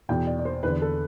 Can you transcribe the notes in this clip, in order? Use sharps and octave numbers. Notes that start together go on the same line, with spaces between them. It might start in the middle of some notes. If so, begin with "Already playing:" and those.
E2 B2 G5
D5
D5
C5
E2 D3 B4
A4